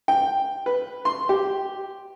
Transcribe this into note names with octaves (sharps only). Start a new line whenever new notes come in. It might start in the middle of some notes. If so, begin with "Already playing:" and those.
G5
B4
C6
G4